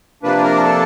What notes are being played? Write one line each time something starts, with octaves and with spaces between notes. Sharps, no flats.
C3 F3 A#3 D4 B4
A#4
A4